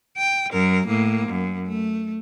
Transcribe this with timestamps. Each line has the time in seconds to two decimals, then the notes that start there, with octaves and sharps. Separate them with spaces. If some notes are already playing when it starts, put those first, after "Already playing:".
0.17 G5
0.52 F#2 A#4
0.87 A2 A#3
1.29 F#2
1.68 A3